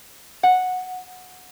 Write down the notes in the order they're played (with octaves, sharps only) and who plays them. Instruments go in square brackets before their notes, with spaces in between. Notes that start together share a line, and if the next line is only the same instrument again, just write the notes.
[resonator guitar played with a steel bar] F#5